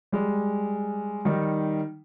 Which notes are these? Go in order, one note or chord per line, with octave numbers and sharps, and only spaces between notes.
G3 G#3
D#3 G3 D#4